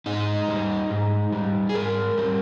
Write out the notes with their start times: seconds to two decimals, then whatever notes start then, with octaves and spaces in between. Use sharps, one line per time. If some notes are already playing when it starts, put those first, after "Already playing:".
0.06 G#2 D#4
0.48 G3
0.91 G#2
1.33 G3
1.69 G#4
1.75 G#2 A#4
2.18 G3